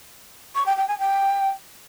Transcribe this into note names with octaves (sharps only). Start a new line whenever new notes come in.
C#6
G5
G5
G#5
G5